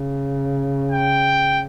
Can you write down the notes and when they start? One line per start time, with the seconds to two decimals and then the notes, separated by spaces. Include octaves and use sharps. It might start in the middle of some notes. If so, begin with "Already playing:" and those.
Already playing: C#3
0.91 G5